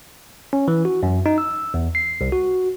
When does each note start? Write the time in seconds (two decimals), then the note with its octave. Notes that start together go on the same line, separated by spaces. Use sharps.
0.53 C#4
0.68 E3
0.85 F#4
1.03 F#2
1.26 D#4
1.38 E6
1.74 E2
1.95 C7
2.21 C2
2.32 F#4